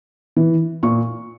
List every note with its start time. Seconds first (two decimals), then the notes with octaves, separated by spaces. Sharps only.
0.36 E3
0.83 A#2 C#6